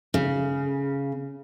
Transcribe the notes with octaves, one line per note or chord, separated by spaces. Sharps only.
C#3